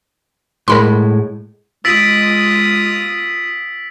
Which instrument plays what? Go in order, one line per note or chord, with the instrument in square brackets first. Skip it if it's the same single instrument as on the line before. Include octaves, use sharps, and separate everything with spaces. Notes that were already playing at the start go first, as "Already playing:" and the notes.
[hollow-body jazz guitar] A2 G#3 [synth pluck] A#4 B5 C6
[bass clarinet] G#3 [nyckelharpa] F4 D#6 [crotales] E6 B6 [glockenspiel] A6 D7 F#7